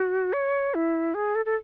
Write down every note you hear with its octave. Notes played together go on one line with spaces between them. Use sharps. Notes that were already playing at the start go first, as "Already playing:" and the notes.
Already playing: F#4
C#5
E4
G#4
A4
A4